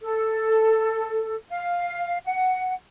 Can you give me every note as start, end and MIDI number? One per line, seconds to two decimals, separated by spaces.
0.01 1.35 69
1.49 2.18 77
2.25 2.73 78